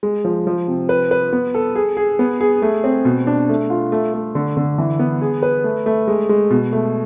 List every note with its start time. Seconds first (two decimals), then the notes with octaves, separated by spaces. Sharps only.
0.03 G#3
0.25 F3
0.47 F3
0.67 C3
0.89 B4
1.11 B4
1.33 B3
1.55 A4
1.75 G#4
1.97 G#4
2.19 B3
2.41 G#4
2.62 A3
2.84 C4
3.05 B2
3.27 D4
3.49 A3
3.70 F4
3.92 A3
4.14 A3
4.35 D3
4.57 D3
4.78 E3
4.99 B3
5.21 G#4
5.42 B4
5.64 A3
5.86 A3
6.08 G#3
6.29 G#3
6.50 B2
6.73 A3